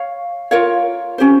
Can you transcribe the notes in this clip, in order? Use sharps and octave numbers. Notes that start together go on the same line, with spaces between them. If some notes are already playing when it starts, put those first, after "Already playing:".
Already playing: C#5 F5
F4 A#4 C#5 F5
C#4 G4 C5